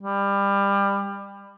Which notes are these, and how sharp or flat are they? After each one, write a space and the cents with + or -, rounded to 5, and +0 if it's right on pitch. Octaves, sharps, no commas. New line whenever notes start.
G3 +25